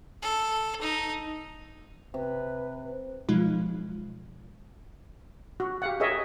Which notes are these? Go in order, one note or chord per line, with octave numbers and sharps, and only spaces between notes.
A4
D#4
C3 B4
B2 F3 F#3 G#3 D#4 F4
F#4
G4 F5 F#5
G#4 A#4 C#5 D#5 E5